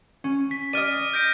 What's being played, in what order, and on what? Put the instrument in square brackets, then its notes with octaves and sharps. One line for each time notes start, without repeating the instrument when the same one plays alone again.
[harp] C#4
[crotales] B6
[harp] D5 D#5 [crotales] F6 D#7
[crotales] G6 A#6 D7